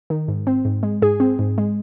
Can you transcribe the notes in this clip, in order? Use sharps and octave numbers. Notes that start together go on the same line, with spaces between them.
D#3
G#2
C4
G#2
G#3
G#2 G#4
C4
G#2
G#3